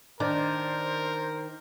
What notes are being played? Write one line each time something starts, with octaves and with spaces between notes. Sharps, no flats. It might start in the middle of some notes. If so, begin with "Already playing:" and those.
D#3 D4 A#4 C5